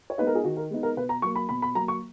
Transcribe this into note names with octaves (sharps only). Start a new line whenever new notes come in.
C#5
G#3 B3 D#4 B4
A#4
G#4
D#3 F#4
A#4
G#3 B3 D#4
A#4
B2 B4
A#5
F#3 A#3 C#6
B5
B2 B5
B5
F#3 A#3 A#5
C#6